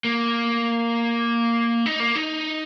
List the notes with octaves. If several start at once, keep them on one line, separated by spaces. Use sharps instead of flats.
A#3
D#4
A#3
D#4